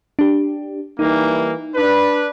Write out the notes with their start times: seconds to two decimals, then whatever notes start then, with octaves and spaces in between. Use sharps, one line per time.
0.19 D4 G4
0.99 E3 G3 A#3 D#4
1.75 D4 B4